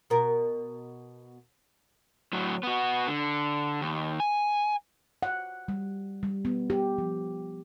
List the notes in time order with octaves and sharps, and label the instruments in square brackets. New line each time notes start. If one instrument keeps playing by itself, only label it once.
[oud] B2 A#4
[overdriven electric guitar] A2 F#3
B3 F#4
D3
D#2
G#5
[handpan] F#5
G3
G3
B3
G4
F3